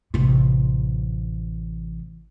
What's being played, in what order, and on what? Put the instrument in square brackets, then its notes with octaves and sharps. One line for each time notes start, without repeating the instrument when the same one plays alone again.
[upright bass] A1 C3